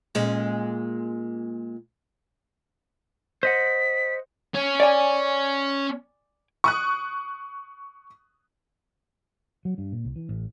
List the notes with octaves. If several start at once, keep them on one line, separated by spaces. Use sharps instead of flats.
A#2 G#3 C#4
C5 D#5 F#5 B6
C#4
D5 G#5
C#6 D#6 F#6
F#3
G2
A#2
C2
E3
A1